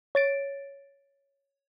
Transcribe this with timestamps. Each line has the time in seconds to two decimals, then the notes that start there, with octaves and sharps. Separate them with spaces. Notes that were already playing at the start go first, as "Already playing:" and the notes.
0.15 C#5 A6 D7